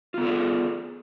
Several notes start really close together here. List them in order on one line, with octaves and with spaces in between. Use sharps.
F4 B3 A4 D5 G#4